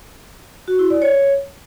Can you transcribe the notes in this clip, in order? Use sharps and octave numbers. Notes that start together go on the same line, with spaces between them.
F#4
E4
D5
C#5